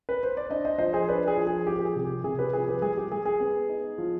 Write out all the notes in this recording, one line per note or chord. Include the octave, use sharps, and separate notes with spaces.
B4
C5
D5
D4 C5 D#5
C5 D#5
F3 C5 D#5
G#4 C5
D4 B4 D5
G#4
F3
G#4
F3 G4
G4
G#4
C3
G4
C3 G#4
G4 B4
F3 G#4
G4 B4
G#3 G#4
G4
G#3 G#4
G#4
B3
D#4
F3